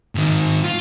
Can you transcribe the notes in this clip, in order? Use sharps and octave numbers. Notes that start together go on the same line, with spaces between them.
G#2 D#3
F4